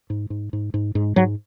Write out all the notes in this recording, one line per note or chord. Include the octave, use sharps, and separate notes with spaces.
G#2
G#2
G#2
G#2
G#2
G#2 F#3